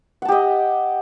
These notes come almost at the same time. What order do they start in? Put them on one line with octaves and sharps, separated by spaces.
F#5 A5 G4 D#5